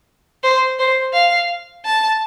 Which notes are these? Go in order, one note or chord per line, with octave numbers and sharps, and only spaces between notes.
C5
C5
F5
A5